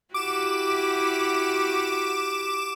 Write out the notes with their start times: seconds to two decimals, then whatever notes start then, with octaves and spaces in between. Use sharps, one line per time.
0.14 E4 F#4 G4 D6 E7